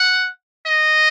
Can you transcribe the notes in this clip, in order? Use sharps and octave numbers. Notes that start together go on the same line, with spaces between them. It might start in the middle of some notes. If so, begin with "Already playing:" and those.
Already playing: F#5
D#5